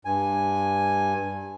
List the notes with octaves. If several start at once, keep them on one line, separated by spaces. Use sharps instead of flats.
G2 G#5